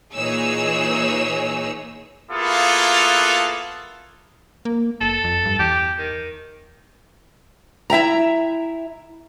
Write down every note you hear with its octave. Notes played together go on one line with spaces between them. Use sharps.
A#2 E3 D#4 G#4 C#5 E6
A#3 B3 E4 F4 G#4 A4
A#3
F#1 A4
F2
G2
E2 G4
D#3
E4 E5 G5 A#5